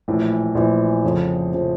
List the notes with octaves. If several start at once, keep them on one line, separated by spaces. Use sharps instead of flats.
A#1 A2 E3
A#1 A2 E3
F1 F2 C#3 F3
C#3 F3